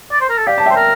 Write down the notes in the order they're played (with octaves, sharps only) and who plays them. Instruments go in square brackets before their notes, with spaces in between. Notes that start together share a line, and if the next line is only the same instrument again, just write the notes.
[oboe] D5
C5
A#4
A4
[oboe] G4 [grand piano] D5 F5
[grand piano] A5
E5 G5
[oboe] C5
A#4